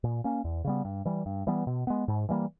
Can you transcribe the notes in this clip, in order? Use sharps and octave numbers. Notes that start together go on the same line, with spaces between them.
A#2
A#3 C#4
E2
C#3 G3 B3
G2
E3 G3
G2
E3 G3 B3
B2
G#3 B3
G#2
E3 G3 A#3